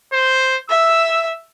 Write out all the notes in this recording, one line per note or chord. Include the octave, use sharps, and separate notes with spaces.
C5
E5 E6